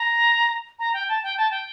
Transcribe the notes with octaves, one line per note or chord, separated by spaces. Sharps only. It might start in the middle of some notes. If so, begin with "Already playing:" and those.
Already playing: A#5
A#5
G5
A5
G5
A5
G5